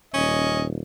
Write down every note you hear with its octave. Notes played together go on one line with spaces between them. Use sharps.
D#1 C#4 D#5